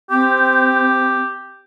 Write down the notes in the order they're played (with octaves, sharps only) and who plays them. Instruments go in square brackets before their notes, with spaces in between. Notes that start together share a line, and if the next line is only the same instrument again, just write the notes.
[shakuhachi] C4 [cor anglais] G4